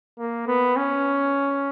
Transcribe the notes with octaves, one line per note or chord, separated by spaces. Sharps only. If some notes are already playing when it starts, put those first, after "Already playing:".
A#3
B3
C#4